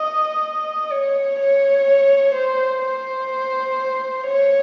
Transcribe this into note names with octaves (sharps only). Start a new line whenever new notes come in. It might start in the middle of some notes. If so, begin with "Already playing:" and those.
Already playing: D#5
C#5
C#5
C5
C5
C#5